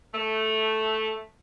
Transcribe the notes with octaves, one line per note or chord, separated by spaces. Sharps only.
A3